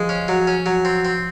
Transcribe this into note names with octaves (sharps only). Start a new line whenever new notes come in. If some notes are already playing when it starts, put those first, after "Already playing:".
Already playing: F3 G#3
C#4
F#3
C#4
F#3
C4
C4